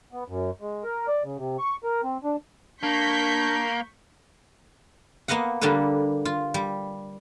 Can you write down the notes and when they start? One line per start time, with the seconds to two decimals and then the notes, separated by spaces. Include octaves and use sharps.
0.13 B3
0.28 F#2
0.61 G#3
0.84 A#4
1.08 D5
1.24 C#3
1.37 C3
1.59 C#6
1.84 A#4
2.03 C4
2.24 D4
2.83 A#3 D4 C#6 G6 B6
5.28 A#3 B3 D#5 F5 F#5
5.61 D3 G3 A#3 D4 A4 B4
6.25 F4
6.54 G3